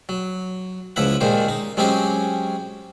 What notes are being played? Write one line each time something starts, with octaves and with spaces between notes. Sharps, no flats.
F#3
C#2 F3 E4 E5 F#5
D#2 A#2 D#3 G#3 C5
D#4
F#3 G#3 C4 C#4 G4 G#4